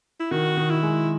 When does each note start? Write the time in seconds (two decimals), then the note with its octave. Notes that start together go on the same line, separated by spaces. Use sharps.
0.20 E4
0.31 D#3 F#4
0.57 D#3
0.70 E4
0.83 G#3